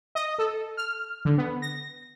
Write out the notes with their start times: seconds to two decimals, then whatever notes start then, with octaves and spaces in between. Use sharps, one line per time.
0.15 D#5
0.38 A4
0.77 F6
1.25 D3
1.38 B3
1.62 A#6